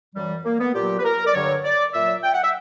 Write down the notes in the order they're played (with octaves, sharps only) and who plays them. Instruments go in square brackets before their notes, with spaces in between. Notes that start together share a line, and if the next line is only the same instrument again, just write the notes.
[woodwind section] F#2 E3 G3
A#3
B3
A#2 F#3 G4
B4
A#4
D5
G2 D3 F#3 C#5
D5
A#2 F#3 E5
G5
F#5
E5